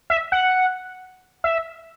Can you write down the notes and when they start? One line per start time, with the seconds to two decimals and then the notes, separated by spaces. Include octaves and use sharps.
0.10 E5
0.32 F#5
1.44 E5